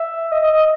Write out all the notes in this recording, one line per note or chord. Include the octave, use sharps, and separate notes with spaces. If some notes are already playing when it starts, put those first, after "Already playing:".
Already playing: E5
D#5
D#5
D#5